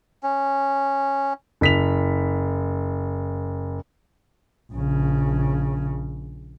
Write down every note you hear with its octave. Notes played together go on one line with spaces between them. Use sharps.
C#4
F#1 B6 F7
A#1 C#3